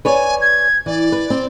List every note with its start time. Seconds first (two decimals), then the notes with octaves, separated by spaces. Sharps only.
0.05 B4 C#5 D5 G#5
0.40 G#6
0.86 E3 D5
1.12 B4
1.30 C4